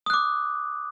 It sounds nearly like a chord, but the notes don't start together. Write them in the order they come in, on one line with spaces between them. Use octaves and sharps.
D#6 F#6 D6